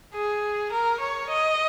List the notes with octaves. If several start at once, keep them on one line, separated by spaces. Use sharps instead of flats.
G#4
A#4
C#5
D#5